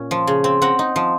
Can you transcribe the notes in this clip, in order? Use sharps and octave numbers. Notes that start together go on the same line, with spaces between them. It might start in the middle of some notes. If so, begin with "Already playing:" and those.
Already playing: A#2 C#4
F3
C#3
C4
C4 F#5 A#5
D#4
F3